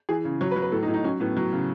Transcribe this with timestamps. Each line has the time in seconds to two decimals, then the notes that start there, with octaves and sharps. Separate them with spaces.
0.09 E3 G#4
0.25 C#3
0.41 F#3 C#5
0.51 B4
0.56 F#3
0.62 B4
0.72 A2 A4
0.83 D#4
0.88 A2
0.94 D#4
1.04 F#3 C#4
1.20 A2 B3
1.37 F#3
1.53 C#3